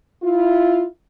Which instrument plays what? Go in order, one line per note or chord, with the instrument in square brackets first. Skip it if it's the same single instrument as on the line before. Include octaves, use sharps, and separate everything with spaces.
[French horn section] E4 F4